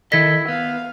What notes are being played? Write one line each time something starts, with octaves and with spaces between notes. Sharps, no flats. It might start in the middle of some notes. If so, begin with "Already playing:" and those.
D#3 E4 A4 D#5 G#6 B6
B3 F5